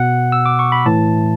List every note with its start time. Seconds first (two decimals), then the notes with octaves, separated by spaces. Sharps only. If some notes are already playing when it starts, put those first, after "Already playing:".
Already playing: B2 F#5
0.32 E6
0.46 D6
0.59 C#6
0.72 B5
0.86 A2 E3 A5